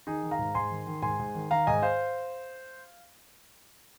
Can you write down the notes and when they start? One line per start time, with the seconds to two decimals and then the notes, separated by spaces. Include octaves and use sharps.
0.07 D#3 D#4 G#4
0.23 D#3
0.31 F5 A#5
0.39 G#2
0.55 G#2 G#5 C6
0.70 D#3
0.87 D#3
1.02 G#2 G#5 C6
1.19 G#2
1.35 D#3
1.51 D#3 F5 A#5
1.67 G#2 D#5 G#5
1.82 C5 F5